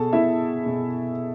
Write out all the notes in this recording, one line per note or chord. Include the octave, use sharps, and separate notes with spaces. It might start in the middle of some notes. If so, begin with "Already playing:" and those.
Already playing: B2 G#4 A4 A5
B2 E4 E5
B2